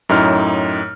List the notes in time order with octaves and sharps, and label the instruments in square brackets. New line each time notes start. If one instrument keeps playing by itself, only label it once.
[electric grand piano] F#2 A2 D#4 C#5 F6